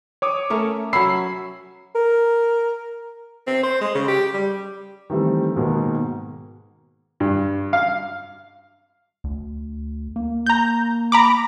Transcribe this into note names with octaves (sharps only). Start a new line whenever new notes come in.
C#5 D6 D#6
A3 C#4 A#4
F#3 C#4 B5 E6 C7
A#4
C4
C5
G#3
C#3
G4
G3
D#3 E3 G3 A3 C4
G#2 B2 D#3 G#3 A#3
G2
F5
D2
A#3
A#5 G6
A#5 B5 D6